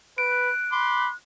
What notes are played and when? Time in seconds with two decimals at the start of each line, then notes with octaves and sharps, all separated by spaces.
0.18 B4 F#6 D7
0.72 B5 C6 D6